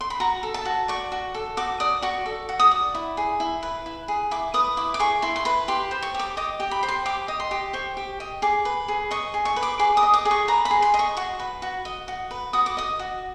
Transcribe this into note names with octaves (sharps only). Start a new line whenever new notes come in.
C6
B5
F#4 A#5
A4
A5
F#4
D5 C#6
F#4
A4
F#4 D6
D5 D#6
F#4 C#6
A4
F#4
D#6
D5
E4
G#4
E4
B4
E4
G#4
E4 D6
B4 D#6
E4 D6
D6
G#4 C#6
E4 C6
C6
B4 B5
G4 C6
C5
C#6
G4
D6
D#5 D6
G4
B5
C5
C6
G4 D6
D#5
C6
G4
C5 C#6
G4
D#5
G#4 D6
B4
G#4
D#5 C#6
G#4
C#6
B4
D6
G#4 D6
D#6
D#5
D6
G#4
C#6
B4 A#5
B5
G#4
C6
D#5
C#6
F#4 C#6
B4
F#4
D#5
F#4
B4
F#4 D#6
D6
D#5 D#6
F#4